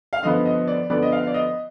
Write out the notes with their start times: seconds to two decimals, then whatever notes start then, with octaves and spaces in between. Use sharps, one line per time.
0.13 F5
0.23 D3 F3 B3 D#5
0.46 D#5
0.67 D5
0.90 D3 F3 B3 D5
1.03 D#5
1.12 F5
1.27 D5
1.34 D#5